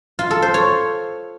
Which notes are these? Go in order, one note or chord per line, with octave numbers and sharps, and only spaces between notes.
F4
A4
C5
C#5